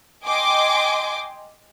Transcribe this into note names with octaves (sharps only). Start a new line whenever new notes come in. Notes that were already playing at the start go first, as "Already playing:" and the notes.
D#5 G5 G#5 C6 D6